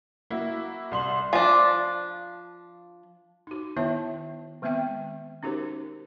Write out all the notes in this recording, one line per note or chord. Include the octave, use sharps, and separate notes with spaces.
A#3 E4 F#4
C2 C6 F#7
F3 D4
D#4 F#4
D#3 B3 E4 C#5 E5 A5
D#3 G#3 B3 C4 E5 G5
C#4 D#4 F#4 G4 A#4 C5